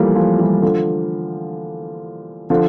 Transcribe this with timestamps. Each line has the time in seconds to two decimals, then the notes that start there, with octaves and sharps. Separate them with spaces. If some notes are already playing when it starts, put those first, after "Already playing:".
Already playing: E3 F3 G3 A3 A#3
0.16 F3 A3
0.39 E3 G3
0.62 D3 F3
2.50 D3 F3